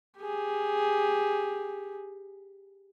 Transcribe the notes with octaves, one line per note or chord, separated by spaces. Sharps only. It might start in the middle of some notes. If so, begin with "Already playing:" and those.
G4 G#4